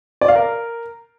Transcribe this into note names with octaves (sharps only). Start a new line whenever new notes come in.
D5
F5
A#4